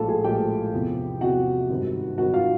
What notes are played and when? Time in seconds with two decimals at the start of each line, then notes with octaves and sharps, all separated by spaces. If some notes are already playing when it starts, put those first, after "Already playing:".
Already playing: A#1 A2 F3 G#3 F4 A4 F5 A5
0.08 G#4 G#5
0.24 A#1 A2 F3 G#3 G4 G5
0.73 E2 C3 F3
1.21 E2 C3 F3 F#4 F#5
1.70 G#1 G2 D#3
2.18 G#1 G2 D#3 F#4 F#5
2.34 F4 F5